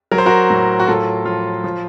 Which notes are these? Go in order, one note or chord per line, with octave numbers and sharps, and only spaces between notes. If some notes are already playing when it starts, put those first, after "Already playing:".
F#3 A#4
C5
F#4 A#4
A2
F#4
A2 F4 A4
F3 F4
F3